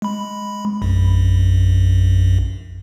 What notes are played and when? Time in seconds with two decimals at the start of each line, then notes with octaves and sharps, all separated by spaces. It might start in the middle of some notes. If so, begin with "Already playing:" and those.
0.02 G#3 B5
0.82 A#1 F#2